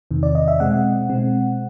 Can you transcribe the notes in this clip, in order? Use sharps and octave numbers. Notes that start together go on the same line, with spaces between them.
E2 C3 D#3
D5
D#5
E5
B2 G#3 C4 F#5
B2 G#3 C4